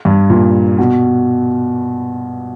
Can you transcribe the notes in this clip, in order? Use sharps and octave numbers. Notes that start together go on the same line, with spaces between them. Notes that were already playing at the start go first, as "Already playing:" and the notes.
G2
A#2
B2